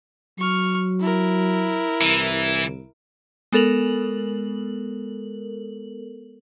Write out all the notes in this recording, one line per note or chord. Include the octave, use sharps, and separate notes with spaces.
F#3 C#6 F6
E4 A#4
C2 E3
G#3 B3 A4 A#4 F#7